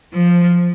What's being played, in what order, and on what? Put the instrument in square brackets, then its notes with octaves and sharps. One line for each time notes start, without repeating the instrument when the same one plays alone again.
[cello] F3